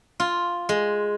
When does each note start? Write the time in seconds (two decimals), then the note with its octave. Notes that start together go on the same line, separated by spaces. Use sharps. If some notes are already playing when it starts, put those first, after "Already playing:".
0.20 F4
0.69 G#3